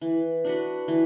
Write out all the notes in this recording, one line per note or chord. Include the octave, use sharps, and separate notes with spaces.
E3
D4 F#4 B4
E3